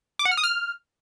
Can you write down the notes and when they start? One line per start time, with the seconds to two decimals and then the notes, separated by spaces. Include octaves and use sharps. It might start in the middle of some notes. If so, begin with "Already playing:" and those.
0.19 D6
0.25 F#5
0.31 F6
0.37 D#6
0.43 F6